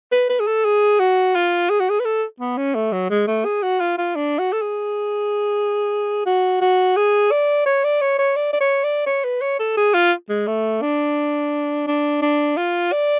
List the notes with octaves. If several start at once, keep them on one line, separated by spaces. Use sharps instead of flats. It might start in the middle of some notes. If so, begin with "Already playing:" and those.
B4
B4
G#4
A4
G#4
F#4
F4
G#4
F#4
G#4
B4
A4
B3
C#4
A3
F#3
G#3
A3
G#4
F#4
F4
F4
D4
F#4
A4
G#4
F#4
F#4
G#4
D5
C#5
D5
C#5
C#5
D5
D5
C#5
D5
C#5
B4
C#5
A4
G#4
F4
G#3
A3
D4
D4
D4
F4
D5